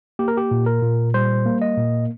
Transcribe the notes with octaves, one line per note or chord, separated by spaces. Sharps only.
A#3 G4
A#4
G4
A#2
A#4
A#2
G3 C5
A#3
D#5
A#2